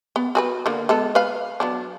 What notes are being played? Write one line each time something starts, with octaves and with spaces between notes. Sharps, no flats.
B3
F#4 G#4 B4
D3 A#3
G#3 B3 A4
B4 F5
F#3 B3 D4